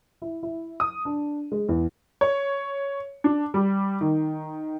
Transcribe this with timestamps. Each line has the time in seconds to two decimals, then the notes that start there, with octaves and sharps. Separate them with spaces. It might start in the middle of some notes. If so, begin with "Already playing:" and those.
0.22 E4
0.43 E4
0.80 D#6
1.05 D4
1.52 G#3
1.69 E2
2.21 C#5
3.24 D4
3.54 G3
4.01 D#3